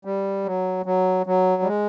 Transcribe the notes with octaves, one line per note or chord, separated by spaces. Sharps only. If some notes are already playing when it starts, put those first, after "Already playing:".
G3
F#3
F#3
F#3
G3
G#3